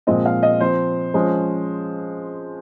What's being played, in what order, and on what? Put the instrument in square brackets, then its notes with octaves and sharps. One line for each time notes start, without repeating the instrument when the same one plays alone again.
[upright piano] A#2 F3 G#3 C4 D#5
F5
D#5
F3 C4 C5
F3 G#3 C#4